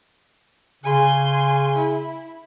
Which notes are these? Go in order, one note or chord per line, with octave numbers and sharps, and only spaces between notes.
C#3 G#5 C6
E4